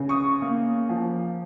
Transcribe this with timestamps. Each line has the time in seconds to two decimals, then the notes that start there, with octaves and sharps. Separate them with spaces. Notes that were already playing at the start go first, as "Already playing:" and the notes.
Already playing: C#3
0.09 C#6 D#6
0.42 A#3
0.89 F3